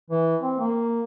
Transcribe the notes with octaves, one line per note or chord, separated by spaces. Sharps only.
E3
C4
A#3